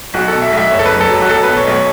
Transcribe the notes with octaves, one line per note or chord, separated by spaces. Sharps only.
B1 F#4
B2 A4
E5
B1
E5
F#1 C#5
A4
F#2 B4
A4
F#3
F#4
B1 A4
B4
B2
C#5
B1 C#5